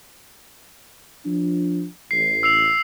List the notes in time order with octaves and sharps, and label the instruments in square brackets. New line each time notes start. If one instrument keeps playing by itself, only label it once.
[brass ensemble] F3 D4
[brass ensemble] A1 [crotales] C7
[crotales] E6 C7 F7